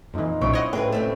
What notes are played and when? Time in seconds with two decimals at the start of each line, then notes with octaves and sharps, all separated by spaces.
0.14 F2 A#2 E3 A#3 D#4
0.41 B1 A#2 C4 C#4 E4 C#6
0.53 C#5 D#5 F#5
0.73 A2 C4 G#4 B4
0.92 C3 A3 C4 G4 D5